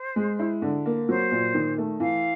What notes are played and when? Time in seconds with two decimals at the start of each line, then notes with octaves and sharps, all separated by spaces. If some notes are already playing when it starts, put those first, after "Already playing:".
Already playing: C5
0.16 G#3
0.39 E4
0.62 D3
0.86 A#3
1.09 F#3 C5
1.31 A#2
1.54 D#3
1.78 A3
2.00 E3 F5